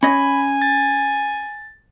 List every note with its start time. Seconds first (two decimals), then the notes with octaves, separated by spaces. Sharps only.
0.03 C#4 D#5 G#5 B5
0.62 A6